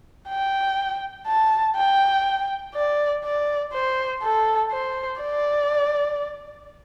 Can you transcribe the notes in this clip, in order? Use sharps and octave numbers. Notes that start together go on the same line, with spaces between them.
G5
A5
G5
D5
D5
C5
A4
C5
D5